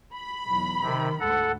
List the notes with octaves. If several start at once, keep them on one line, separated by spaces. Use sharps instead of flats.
B5
B1 E2
C3 D#3
D2 G#2 A4 F#5